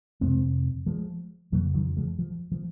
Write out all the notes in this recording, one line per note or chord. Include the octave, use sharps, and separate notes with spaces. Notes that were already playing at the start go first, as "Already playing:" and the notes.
F2 C3 G#3 C4
F3 G#3
F2 C#3 F#3 A#3
D#3 F#3
F3 G#3
F3
F3